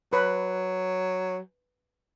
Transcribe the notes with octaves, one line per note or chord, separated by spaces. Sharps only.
F#3 B4